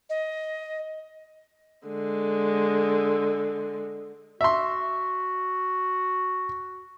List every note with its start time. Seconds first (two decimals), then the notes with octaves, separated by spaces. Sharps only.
0.10 D#5
1.87 D3 G#3
4.41 F#4 E5 C6